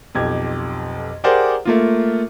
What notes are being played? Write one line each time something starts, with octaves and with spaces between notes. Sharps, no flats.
B1 F2 G4 G#6
G4 G#4 A#4 C5 D5 F#5
A3 A#3 F4